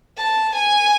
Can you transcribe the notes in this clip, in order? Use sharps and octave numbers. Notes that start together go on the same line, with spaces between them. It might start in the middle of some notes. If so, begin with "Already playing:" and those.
A5
G#5